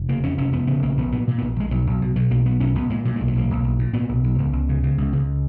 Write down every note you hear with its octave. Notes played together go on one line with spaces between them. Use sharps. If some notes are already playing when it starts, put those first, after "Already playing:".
Already playing: F1
C#3 A#3
F2 C#4
F1 C#4
F1 B3
C#3 B3
A#1 A#3
A#1 B3
A#2 B3
A#2
B3
A#1
A#1 G#3
B1 F#3
B1
B2
B2 F#3
B1 A#3
B1 B3
B1 C#4
B1 B3
A#2 G#3
A#2 F#3
G#3
B1
F#3
B1 A#3
B1
B1
A#2
A#2 B3
B1
B1
C#2
C#2
C#3
C#3
C#2
C#2